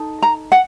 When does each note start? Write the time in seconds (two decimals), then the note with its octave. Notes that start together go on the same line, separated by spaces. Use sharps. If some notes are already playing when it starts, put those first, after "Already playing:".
Already playing: D#4 A4
0.22 A#5
0.52 F#5